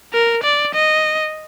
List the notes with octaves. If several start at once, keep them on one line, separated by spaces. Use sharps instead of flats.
A#4
D5
D#5